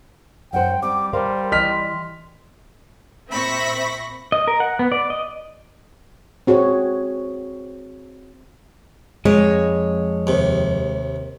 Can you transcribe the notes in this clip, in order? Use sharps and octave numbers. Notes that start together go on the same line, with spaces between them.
F#2 C5 F#5 G5
G3 C4 D6
G3 A#4 C5 F5 C6
E3 D#5 F6 B6
A#2 C4 E5 B5 C#6 A#6
D#5
A#4
F#5
B3
D5
D#5
C4 F#4 G#4 C#5
F2 G#3 C#5
D#2 C3